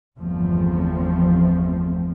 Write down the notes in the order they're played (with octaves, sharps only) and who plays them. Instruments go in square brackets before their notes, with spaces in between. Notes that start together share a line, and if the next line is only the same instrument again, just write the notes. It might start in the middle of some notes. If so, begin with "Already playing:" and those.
[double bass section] G1 E2 F3 A3 C4